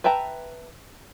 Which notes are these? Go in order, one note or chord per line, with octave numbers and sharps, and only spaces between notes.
B4 E5 G5 A5 A#5